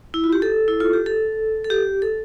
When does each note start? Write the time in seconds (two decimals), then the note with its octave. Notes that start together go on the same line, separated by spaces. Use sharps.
0.14 E4
0.24 F4
0.33 G4
0.42 A4
0.68 E4
0.80 F4
0.93 G4
1.06 A4
1.65 A4
1.70 G4
2.02 A4